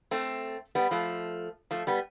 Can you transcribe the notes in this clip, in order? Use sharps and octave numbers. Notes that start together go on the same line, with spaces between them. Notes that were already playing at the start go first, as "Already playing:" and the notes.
A3 C4
G3 B3
F3 A3
F3 A3
G3 B3